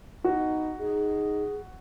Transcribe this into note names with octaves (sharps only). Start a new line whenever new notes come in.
B3 D#4 F#4
D#4 G#4